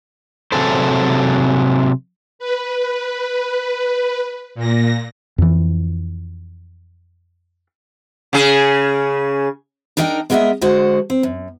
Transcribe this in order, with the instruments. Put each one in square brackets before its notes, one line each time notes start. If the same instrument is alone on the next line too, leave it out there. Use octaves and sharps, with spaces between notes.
[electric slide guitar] C3 F#3 G#4 A4 C5
[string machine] B4
A#2 A#6
[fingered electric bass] F2 E3
[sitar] C#3 G#4
[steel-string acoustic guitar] D4 D#4 A#4 D#5 F5 G5
G#3 B3 A#4 C#5 D#5 E5
D3 G#3 F#4 C5
C4
F#2